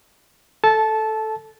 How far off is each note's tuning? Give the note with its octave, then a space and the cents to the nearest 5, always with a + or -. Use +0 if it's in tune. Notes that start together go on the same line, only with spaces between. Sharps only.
A4 +0 A5 -15